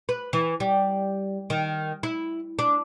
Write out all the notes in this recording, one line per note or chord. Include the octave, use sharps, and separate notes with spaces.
B4
E3
G3
D#3
E4
D4